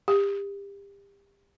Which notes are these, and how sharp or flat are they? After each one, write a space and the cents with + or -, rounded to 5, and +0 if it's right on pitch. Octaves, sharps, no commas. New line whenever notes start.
G4 +30